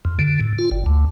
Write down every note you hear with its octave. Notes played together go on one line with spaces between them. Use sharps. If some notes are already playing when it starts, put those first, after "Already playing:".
F2
D3
A2
F4
G1
D2